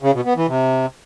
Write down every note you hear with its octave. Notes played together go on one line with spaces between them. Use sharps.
C#3
B2
B3
E3
C3